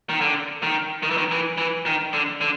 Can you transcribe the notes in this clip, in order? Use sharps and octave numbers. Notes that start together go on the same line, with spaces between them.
D#3
D3
D#3
D#3
E3
D#3
E3
E3
D#3
D3
D3